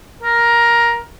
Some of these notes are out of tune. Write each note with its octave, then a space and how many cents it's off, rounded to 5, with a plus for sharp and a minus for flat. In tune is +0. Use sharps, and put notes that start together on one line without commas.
A#4 +10